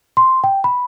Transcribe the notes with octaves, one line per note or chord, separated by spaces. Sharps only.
C6
G5
B5